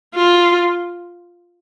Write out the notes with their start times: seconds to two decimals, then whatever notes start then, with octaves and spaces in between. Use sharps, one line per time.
0.15 F4